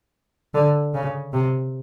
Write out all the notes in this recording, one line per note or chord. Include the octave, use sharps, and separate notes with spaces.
D3
C#3
C3